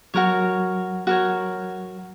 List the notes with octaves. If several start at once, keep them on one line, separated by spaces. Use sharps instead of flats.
F#3 F#4 A#4 C#5
F#4 A#4 C#5